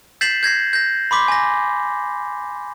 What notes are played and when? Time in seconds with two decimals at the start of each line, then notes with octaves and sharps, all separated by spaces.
0.21 G6 A6 B6 C7 E7 F#7
0.43 G6 G#6 A#6 C7
0.73 G6 A#6
1.11 B5 C6 D6 B6
1.28 G#5 A#6